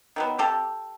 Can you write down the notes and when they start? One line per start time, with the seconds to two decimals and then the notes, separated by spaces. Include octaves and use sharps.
0.16 D#3 F#3 B3
0.38 C3 G4 A4